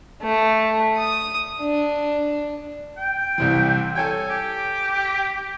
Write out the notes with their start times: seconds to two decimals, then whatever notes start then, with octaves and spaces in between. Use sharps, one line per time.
0.22 A3
0.97 D#6
1.61 D4
2.97 G5
3.38 C2 C3 E3
3.95 A4 C#5 G5 G#5
4.30 G4